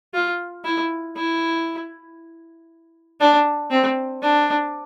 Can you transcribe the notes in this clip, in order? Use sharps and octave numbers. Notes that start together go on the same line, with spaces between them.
F4
E4
E4
D4
C4
D4